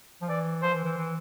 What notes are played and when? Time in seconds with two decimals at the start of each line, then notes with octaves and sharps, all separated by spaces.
0.22 F3
0.28 E3 D5
0.63 F3 C5
0.74 E3
0.85 E3
0.97 E3